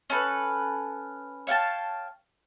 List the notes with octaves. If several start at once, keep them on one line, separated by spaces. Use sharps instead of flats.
C#4 A4 B4
C#5 F5 G5 A5